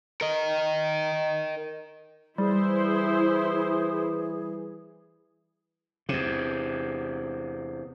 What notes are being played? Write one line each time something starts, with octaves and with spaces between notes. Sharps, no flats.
A#4 D#5
E3 G3 E4 G#4 C5
E2 C3